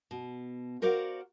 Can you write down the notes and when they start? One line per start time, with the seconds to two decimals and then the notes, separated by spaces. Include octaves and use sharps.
0.11 B2
0.82 F#4 A#4 C5 D5 F5 F#5